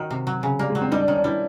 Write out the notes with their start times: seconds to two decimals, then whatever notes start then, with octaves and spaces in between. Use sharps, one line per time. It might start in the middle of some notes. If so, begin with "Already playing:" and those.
Already playing: D#3 F#3
0.11 C3
0.27 F#3
0.43 C#3
0.59 G3 A#3
0.70 G#3
0.75 F#3
0.81 C4
0.92 G3 D#4
1.00 D4
1.08 D#3 C#4
1.16 D4
1.24 G3 E4